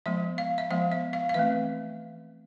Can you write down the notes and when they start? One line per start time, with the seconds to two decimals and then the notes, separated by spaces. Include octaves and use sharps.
0.06 F3 G#3 B3 E5
0.38 F5
0.58 E5
0.70 F3 G#3 B3 F5
0.92 E5
1.13 F5
1.29 F5
1.34 E3 A3 C4 E5